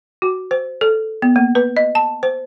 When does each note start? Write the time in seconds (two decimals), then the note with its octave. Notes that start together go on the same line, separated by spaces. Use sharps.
0.22 F#4
0.51 C5
0.81 A4
1.22 B3
1.36 A#3
1.55 B4
1.77 D#5
1.95 A5
2.23 C5